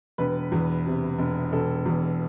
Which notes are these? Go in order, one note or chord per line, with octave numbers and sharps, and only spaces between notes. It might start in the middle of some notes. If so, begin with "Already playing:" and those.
E1 B4
E2
C3
E1
E1 A4
E2